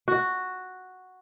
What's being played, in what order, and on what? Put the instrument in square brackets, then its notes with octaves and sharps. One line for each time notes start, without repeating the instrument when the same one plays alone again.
[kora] F#4